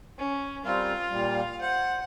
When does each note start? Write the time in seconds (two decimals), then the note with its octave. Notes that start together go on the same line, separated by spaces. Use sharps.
0.18 C#4
0.65 G3 C4 F4 A#4 F5
1.10 A#2 G3
1.61 C5 F#5